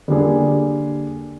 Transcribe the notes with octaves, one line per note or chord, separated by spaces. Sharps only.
D3 G3 A#3 D4 G#4